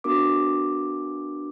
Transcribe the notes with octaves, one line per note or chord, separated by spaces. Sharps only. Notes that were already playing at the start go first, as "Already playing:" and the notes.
B3 D4 F#4 A#4 D6